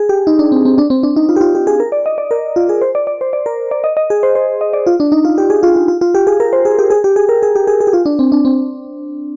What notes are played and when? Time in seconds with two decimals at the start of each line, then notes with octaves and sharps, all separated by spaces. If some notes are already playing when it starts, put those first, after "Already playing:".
Already playing: G#4
0.09 G4
0.27 D#4
0.39 D4
0.52 C4
0.65 C4
0.78 D4
0.90 C4
1.03 D4
1.16 D#4
1.29 F4
1.36 G4
1.41 F4
1.55 G4
1.67 G#4
1.80 A#4
1.92 D5
2.06 D#5
2.18 D5
2.31 A#4
2.56 F4
2.69 G#4
2.81 C5
2.95 D5
3.07 D5
3.21 C5
3.33 D5
3.46 A#4
3.71 D5
3.84 D#5
3.97 D#5
4.10 G#4
4.23 C5
4.35 C5
4.61 D#5
4.73 D5
4.87 F4
5.00 D4
5.12 D#4
5.25 F4
5.38 G4
5.50 G#4
5.63 F4
5.76 F4
5.88 F4
6.01 F4
6.15 G4
6.27 G#4
6.40 A#4
6.53 C5
6.65 G#4
6.79 G4
6.90 G#4
7.04 G4
7.16 G#4
7.29 A#4
7.43 G#4
7.56 G4
7.67 G#4
7.81 G#4
7.87 G4
7.93 F4
8.06 D4
8.19 C4
8.32 D4
8.45 C4